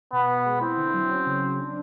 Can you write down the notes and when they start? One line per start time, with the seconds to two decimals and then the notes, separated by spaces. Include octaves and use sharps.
0.13 B2 B3
0.29 B2
0.45 G#3
0.61 C4 E4
0.77 D3
0.94 F#3
1.10 C#4
1.26 C#3
1.43 F#3
1.58 D4